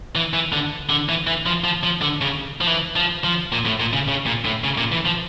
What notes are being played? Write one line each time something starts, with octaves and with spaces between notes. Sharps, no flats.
E3
E3
D3
D3
E3
E3
F3
F3
F3
D3
C#3
F3
E3
F3
F3
A#2
A2
A#2
C#3
C#3
A#2
A2
C#3
A#2
E3
F3